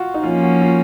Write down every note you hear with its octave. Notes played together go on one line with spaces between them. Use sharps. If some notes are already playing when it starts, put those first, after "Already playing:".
Already playing: F4 F#4
D#4
F3 A#3 C#4 F4
F#4
F4